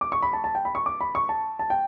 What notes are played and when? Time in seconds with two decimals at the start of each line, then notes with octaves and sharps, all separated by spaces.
0.01 D6
0.12 C#6
0.22 B5
0.33 A5
0.44 A5
0.55 G5
0.65 B5
0.75 C#6
0.86 D6
1.01 B5
1.15 C#6
1.29 A5
1.59 A5
1.70 G5